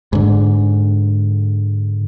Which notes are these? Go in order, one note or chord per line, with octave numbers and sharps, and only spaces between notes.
G#2 D3